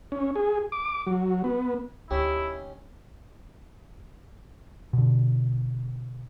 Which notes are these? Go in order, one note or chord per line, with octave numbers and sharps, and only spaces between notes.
C#4
G#4
D6
F#3
B3
D2 C#4 D#4 E4 G4
B2 D3